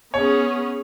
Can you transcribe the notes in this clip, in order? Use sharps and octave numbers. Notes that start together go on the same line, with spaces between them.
B3 C#4 G#4 C#5